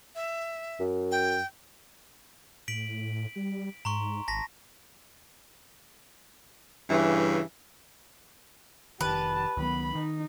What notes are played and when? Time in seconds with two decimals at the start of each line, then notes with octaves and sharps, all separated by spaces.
0.15 E5
0.80 F#2
1.11 G5
2.68 A2 B6 D7 F#7
3.36 G3
3.85 G#2 A#5 C6 C#6
4.28 G#1 A5 A#6 B6
6.90 G2 C#3 E3
9.01 F1 A#1 D#3 G4 B4 A5
9.57 C#2 D#3 F#3 B3 B5
9.95 D#3 D#4